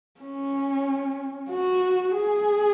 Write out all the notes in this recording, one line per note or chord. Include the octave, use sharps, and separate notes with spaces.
C#4
F#4
G#4